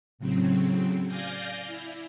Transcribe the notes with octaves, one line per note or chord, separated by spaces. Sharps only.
A2 C#3 F#3 C4
D5 F5 G#5 F6 G6 A#6
E4